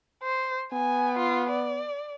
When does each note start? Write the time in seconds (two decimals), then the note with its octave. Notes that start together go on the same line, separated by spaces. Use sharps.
0.23 C5
0.73 B3 G#5
1.18 F4
1.50 D5